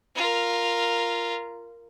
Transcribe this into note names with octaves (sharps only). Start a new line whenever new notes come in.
F4 A#4